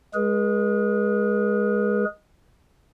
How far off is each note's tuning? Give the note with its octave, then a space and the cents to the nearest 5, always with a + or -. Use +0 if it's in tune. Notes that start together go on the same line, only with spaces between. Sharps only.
G#3 +0 G#4 +0 B4 -40